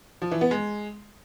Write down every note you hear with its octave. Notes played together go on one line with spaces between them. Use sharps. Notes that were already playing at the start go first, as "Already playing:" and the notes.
F3
E3
B3
G#3